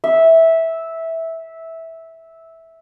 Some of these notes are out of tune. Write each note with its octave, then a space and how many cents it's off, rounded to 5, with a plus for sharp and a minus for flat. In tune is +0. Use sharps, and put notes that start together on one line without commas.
E5 -10